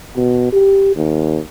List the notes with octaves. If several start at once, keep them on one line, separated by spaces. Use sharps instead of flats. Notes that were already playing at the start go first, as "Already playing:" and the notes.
B2
G4
D#2